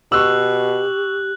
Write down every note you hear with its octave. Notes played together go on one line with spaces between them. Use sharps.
B2 G4 C#6 E6 F#6 F#7